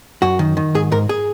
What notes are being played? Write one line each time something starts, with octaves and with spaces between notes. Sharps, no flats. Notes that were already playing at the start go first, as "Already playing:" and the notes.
F#2 F#4
D#3
D#3
G#2 G#4
G#2 A#4
G#4